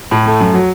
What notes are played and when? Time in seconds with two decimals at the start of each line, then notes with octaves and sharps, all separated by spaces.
0.11 A2
0.26 A3
0.40 F#2
0.54 F#3